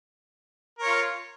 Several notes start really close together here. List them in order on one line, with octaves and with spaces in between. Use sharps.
A#4 C#5 F4